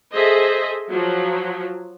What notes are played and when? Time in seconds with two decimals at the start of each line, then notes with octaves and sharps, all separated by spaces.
0.13 G#4 A4 C5 D#5 E5
0.91 F3 F#3